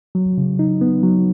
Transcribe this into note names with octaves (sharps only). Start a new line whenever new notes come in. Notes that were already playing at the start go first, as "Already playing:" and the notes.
F#3
C#3
D#4
B3
F#3